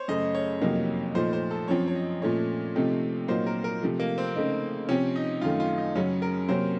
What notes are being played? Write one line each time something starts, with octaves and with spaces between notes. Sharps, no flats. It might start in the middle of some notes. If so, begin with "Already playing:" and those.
Already playing: C5 C#5
F#2 C#3 A3 D#5
C#5
F2 C3 F#3 A#3 D#4
A#2 F3 A3 D#4 C5
C5
A4
F#2 F3 C4 C#5
C#5
D#5
A#2 F3 A3 C#4 C#5
C3 F3 A3 C4 D#4
A#2 F#3 A#3 D#4 C5
A#4
A#4
C3 F3 A3
A#3
C4
C#3 A3 D#4
C3 F3 C4 C#4
D#4
F#2 D#3 A3 F4
F4
D#4
F#2 C#3 F#3 C#4
A#4
C3 F#3 A#3 C#4 C5